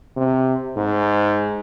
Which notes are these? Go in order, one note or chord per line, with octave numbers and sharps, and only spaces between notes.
C3
G#2